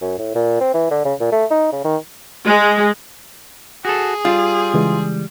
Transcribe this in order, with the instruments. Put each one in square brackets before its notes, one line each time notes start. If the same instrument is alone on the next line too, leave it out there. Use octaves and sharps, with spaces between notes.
[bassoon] F#2
A2
A#2
C4
E3
D3
C#3
A#2
A3
D#4
C#3
D#3
[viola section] G#3
[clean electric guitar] F#4 A4 [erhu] G#4
[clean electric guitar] G3 [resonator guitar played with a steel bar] F4
[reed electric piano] C#3 E3 G#3